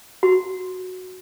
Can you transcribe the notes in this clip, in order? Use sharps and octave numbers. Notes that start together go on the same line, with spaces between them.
F#4